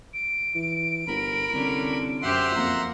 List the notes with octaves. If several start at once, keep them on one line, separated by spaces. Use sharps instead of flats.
D7
E3
G1 A#4 B5
C2 D3 C#4 D4
F#2 G4 C5 E5 F#5 C6
F2 A#3 A#5